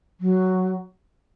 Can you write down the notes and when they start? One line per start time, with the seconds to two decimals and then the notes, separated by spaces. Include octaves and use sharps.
0.21 F#3